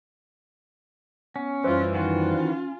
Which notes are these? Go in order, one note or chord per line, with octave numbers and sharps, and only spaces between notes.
B3 C#4
F#2 E3 G3 F4 B4 C5
D#3 E3 F4 F#4
C#4